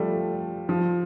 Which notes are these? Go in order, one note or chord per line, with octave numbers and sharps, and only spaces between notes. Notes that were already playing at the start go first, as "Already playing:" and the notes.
Already playing: F3 G3 A3
F3